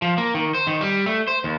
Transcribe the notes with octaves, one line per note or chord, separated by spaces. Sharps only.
F3
A#3
D#3
C5
D#3
G3
A3
C5
D#2